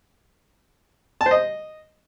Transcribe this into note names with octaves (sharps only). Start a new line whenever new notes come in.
A5
C5
D#5